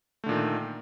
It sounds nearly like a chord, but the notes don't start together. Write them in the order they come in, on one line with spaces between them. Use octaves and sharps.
A3 D3 A#2 D#3